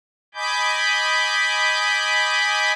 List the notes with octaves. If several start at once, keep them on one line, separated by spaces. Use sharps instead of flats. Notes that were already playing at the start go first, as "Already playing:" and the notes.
D#5 G#5 B5 D6 G6